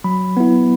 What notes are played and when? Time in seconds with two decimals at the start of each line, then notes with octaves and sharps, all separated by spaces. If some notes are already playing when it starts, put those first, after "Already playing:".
0.04 F#3 B5
0.37 B3 E4